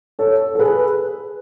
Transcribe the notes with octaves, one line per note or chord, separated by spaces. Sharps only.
A4 C#5
A4
G#4 B4